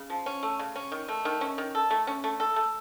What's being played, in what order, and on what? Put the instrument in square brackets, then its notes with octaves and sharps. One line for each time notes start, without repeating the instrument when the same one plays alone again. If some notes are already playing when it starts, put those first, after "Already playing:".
Already playing: [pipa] C#3
F3
C#4
A3
C#3
C#4
D#3
A3
D#3
C#4
D#3
A4
A3
C#4
A3
A4
A3